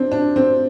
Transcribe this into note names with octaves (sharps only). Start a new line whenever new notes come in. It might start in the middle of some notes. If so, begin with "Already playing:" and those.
Already playing: C4 D4
D4
C4